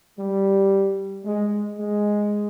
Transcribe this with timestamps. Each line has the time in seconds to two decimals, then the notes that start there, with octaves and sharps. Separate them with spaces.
0.18 G3
1.24 G#3
1.78 G#3